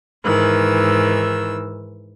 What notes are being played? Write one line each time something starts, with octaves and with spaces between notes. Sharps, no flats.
G#2 D#3 E3 E6